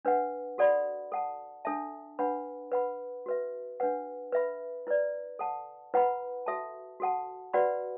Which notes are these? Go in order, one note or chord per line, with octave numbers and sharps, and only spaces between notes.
D4 B4 F#5
F#4 A4 D5 F#5 B5
A4 F#5 A5
D4 A4 E5 A5
D4 B4 F#5 B5
B4 F#5 B5
F#4 B4 E5
D4 B4 F#5
B4 E5 B5
E4 B4 D5
A4 F#5 A5
E4 B4 F#5 B5
F#4 A4 E5 A5
F#4 A4 F#5 A5
F#4 B4 D5 F#5 B5